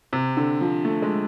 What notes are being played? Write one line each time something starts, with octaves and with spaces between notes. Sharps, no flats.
C3
D3
F3
A3
G#3